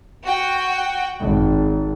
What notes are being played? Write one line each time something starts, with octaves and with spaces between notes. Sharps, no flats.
F#4 G5
G#1